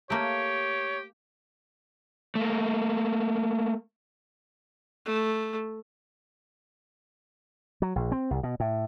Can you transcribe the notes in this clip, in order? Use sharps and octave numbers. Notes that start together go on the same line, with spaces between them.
A3 A#3 G4 C#5
A3 A#3
A3
F#3
A#1
C4
C2
B2
A2